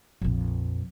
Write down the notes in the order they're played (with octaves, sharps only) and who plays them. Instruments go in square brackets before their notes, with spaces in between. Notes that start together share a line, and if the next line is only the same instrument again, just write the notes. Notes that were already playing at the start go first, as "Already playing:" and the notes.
[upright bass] A#1 F2